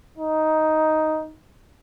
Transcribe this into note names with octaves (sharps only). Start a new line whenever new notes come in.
D#4